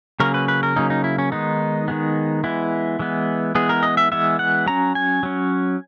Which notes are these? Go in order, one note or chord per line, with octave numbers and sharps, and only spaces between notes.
C#3 F#3 A#3 C#4 A#4
B4
B4
A#4
C#3 F#3 A#3 C#4 D#4
D#4
E4
C#4
D#3 G#3 B3 D#4
D#3 G#3 B3
E3 G#3 B3 E4
E3 G#3 B3
E3 G#3 B3 G#4
A#4
D#5
E5
E3 G#3 B3 E5
F#5
F#3 C#4 A#5
G#5
F#3 C#4